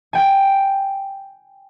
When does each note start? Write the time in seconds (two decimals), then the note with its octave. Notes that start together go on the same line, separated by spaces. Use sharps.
0.13 G5 G#5